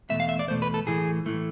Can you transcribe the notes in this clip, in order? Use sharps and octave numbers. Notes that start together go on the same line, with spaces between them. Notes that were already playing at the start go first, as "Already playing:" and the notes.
E2 B2 A3 E5
F5
E5
D5
E2 B2 A3 C5
B4
A4
A2 E3 A3 G#4
A2 E3 A3